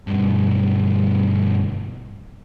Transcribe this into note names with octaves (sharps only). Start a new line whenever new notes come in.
B1 G2